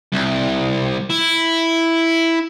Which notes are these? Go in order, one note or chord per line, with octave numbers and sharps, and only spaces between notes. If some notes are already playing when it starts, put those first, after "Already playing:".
C2
E4